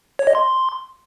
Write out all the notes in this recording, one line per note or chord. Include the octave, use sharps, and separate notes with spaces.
C#5
D#5
C6